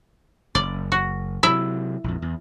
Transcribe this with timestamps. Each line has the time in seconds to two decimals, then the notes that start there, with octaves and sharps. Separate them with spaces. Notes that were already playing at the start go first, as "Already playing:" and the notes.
0.55 F#1 D5
0.92 F#4
1.43 C3 F#3 E4 E5
2.04 A#1 F2
2.22 E2